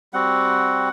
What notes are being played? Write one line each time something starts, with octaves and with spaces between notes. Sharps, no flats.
G3 C4 F#4 F#5